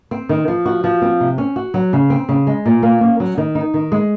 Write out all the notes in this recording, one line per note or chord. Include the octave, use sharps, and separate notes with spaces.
C4
D#3
F3
F#4
F3
C4
C3
C#4
F#4
F#3
C#3
C4
C#3
G#3
A#2
A#3
C#4
F#3
D#3
D#4
D#3
G#3